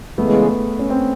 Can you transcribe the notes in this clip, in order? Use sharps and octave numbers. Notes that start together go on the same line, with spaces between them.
C#3 E3 G#3 A3 B3
C#4
C4